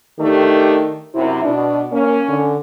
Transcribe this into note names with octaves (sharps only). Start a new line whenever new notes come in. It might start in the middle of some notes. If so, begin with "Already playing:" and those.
D#3 A3 D4 G4
F#2 C3 E4
B2 D4
A#3 C#4
D3